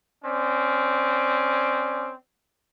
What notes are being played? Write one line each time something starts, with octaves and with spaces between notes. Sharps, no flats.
C4 C#4 D5